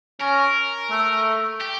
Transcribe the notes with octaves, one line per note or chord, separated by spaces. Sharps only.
C#4 A#4
A3
G4